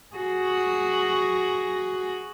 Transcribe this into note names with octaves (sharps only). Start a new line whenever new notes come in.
F#4 G#4